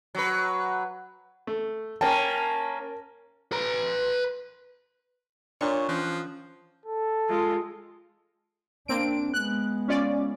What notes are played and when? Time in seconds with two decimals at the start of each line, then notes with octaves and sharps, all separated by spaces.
0.15 F#3 B4
1.47 A3
2.01 A#3 C#4 A#4 G5 A5
3.52 B4 A#5
5.61 A#2 D4 C#5 C#6
5.89 E3 F3 C#4 D#6 F#6
6.86 A4
7.29 G#3 F4
8.88 A#3 C4 D4 D7
9.34 G#3 B3 F#6
9.88 C#4 F4 D5